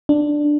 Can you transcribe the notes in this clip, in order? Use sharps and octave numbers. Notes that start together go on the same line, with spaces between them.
D4